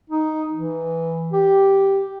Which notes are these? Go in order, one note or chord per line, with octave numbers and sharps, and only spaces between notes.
D#4
E3
G4